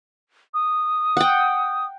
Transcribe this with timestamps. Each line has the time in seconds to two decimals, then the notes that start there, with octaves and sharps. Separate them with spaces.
0.54 D#6
1.17 F#5 G5